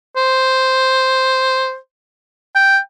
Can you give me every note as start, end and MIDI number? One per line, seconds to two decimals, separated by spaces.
0.16 1.76 72
2.55 2.79 79